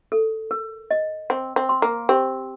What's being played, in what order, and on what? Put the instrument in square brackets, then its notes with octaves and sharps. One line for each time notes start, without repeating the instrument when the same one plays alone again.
[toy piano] A4
A#4
D#5
[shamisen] C4 [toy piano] G5
[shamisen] C4
[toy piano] C6
[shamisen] A#3
[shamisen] C4 [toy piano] G4